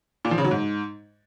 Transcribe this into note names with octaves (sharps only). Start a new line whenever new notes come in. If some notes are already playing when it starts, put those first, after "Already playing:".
A#2
F3
C#3
F#3
G#2